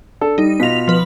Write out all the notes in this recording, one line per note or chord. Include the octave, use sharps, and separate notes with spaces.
D4 A4 A5
G3 D#4
B2 F4 A#6 B6 F7
F3 B4